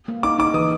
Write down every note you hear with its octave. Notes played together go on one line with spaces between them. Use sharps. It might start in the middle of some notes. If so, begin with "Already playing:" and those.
A#3
D#4 D6
D#4 D6
E3 D#6